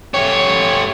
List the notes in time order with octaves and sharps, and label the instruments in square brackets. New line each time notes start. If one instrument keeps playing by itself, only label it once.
[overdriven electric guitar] A3 G4 [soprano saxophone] C#5